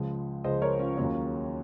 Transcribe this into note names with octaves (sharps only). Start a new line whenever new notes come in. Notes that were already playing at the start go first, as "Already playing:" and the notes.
Already playing: C#2 C#3 F3 G#3
C#2 C#3 F3 G#3 C5 D#5
A#4 C#5
C#4 F4
D#2 D#3 F#3 A#3 C#4 F4